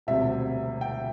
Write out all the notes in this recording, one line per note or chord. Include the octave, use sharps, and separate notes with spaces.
E1 D2 C3 G3 C4 E5
G5